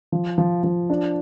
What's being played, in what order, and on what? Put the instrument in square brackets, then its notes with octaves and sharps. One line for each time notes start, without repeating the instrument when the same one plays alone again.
[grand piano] F3
F3
F3
D4